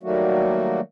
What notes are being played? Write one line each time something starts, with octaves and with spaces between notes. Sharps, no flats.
D#3 F#3 G3 A3 A#3 F#4